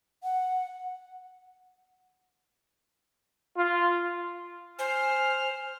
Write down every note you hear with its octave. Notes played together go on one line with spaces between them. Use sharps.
F#5
F4
C5 G#5 F6